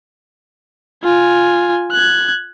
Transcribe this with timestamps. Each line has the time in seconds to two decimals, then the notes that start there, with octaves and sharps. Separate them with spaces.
1.04 F4 G#5
1.92 F#6 G#6